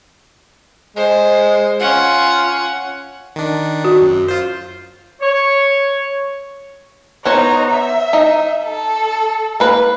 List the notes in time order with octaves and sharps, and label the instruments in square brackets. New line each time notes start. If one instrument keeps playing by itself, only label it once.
[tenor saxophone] G#3 [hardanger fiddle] C5
[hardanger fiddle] C#4 F#5 [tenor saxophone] F4
[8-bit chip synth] D#3 D4
[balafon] F#4
[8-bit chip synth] F#2
F4 C5
[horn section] C#5
[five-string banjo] B3 C5 C#5 [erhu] D#4
[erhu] E5
[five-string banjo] D#4
[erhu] A4
[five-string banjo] A#3 B4